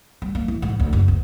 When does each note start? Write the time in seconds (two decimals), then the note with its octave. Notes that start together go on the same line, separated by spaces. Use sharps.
0.22 G3
0.35 A#3
0.48 E3
0.62 G#2
0.80 D2
0.93 F#1
1.08 D2